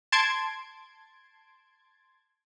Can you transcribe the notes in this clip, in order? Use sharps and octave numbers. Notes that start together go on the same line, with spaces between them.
A5 C6 G#6 D7